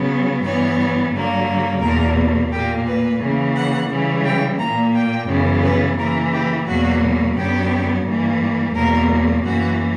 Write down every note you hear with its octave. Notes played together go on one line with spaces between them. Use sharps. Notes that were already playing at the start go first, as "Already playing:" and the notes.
Already playing: C#3 F#3 B3
G2 E3 B3 C#5
G2 D3 F#3 A#3
E2 B2 A#3 A#4
A#2 A#3 G4
B4
C#3 E3 A#3
F#5
C#3 E3 G3
G5
A#2 A#3 A#5
G5
F#2 C#3 E3 B3
B4
C#3 E3 A#3 A#4
G4
E2 B2 F#3 A#3 F#4
F#2 D3 F#3 B3 G4
G2 E3 A#3
E2 B2 F#3 A#3 A#4
F#2 E3 A#3 F#4